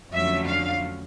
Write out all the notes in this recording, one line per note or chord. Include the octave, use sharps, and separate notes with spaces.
F2 D3 F#3 A3 C#4 E5
F5